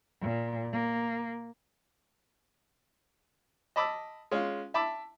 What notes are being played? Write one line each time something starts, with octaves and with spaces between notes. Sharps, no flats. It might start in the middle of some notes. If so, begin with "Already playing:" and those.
A#2
A#3
D#5 A5 B5 D6 E6
G#3 C#4 F4
E5 A5 B5 D6 E6